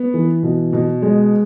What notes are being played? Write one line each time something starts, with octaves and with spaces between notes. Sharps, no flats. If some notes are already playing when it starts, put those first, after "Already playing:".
Already playing: B3
E3
B2
B2
G#3